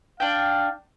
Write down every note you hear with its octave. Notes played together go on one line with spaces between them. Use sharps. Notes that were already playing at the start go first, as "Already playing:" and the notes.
D4 F5 G5